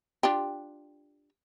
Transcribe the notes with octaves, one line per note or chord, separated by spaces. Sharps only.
D4 F4 G4